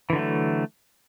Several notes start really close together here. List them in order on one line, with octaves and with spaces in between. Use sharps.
E3 D3 F#3 A3